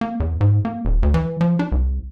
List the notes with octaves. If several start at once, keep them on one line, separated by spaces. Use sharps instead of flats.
A#3
E2
G#2
A#3
D#1
D2
E3
F3
D4
C2